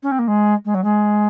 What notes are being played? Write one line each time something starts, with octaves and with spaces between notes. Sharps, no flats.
C#4
C4
A#3
G#3
G#3
F#3
G#3